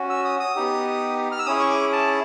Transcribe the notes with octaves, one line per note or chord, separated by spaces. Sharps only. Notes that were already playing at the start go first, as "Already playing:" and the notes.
Already playing: C#4 F#4
E6
D#6
D#6
B3 D#4 G4
F6
E6
C#4 E4 G#4 D#6
C#6
D6
A5